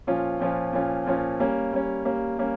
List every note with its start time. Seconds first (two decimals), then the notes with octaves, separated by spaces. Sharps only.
0.07 A#2 F3 C#4 F4
0.40 A#2 F3 C#4 F4
0.73 A#2 F3 C#4 F4
1.06 A#2 F3 C#4 F4
1.40 G3 A#3 C#4
1.72 G3 A#3 C#4
2.05 G3 A#3 C#4
2.39 G3 A#3 C#4